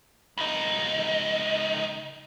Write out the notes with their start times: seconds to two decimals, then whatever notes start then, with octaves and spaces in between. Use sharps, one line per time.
0.38 C#2 D#4